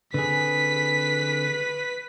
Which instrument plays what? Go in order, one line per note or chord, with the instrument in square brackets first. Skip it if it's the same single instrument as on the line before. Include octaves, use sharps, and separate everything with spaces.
[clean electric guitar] D3 C4 G#4 [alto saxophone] B4 [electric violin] B6